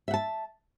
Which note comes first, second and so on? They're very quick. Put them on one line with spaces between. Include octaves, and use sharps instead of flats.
E5 F#5 A5